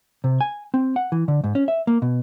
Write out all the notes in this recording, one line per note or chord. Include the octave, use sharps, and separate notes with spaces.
C3
G#5
C4
F#5
E3
D3
G#2
C#4
E5
A#3
B2